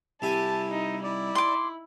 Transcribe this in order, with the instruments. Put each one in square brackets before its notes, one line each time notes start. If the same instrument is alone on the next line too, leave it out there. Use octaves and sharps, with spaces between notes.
[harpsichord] C2 G4 G#5 [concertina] E4 [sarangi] A5
[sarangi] D#4
[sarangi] E4 [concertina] D5
[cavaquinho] C6 D6